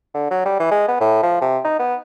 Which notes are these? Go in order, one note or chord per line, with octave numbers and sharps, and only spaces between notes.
D3
F#3
G3
E3
G#3
B3
A2
F3
C3
D#4
B3